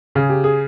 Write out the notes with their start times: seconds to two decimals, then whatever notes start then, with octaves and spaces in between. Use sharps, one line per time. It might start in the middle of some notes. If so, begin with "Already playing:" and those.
0.15 C#3 G#4
0.30 G4
0.44 G#4